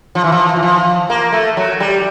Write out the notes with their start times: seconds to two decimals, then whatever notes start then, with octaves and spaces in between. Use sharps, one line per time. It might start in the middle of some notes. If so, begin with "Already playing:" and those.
0.15 F3
0.24 E3
0.32 F3
0.56 E3
0.62 F3
1.10 A#3
1.32 A3
1.57 F#3
1.80 G3